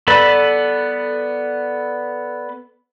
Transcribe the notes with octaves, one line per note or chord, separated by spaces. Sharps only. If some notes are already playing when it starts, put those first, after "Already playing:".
B3 A4 B4 D5 B5